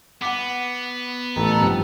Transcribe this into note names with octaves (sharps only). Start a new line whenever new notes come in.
B3 F#5 D6
A1 A3 A4 A#5
G2 C3 F3 D#4 G4 G5